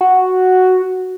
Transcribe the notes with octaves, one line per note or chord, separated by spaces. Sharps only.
F#4